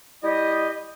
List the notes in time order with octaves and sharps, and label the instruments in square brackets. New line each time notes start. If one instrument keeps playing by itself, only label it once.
[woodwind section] G3 E4 G4 D#5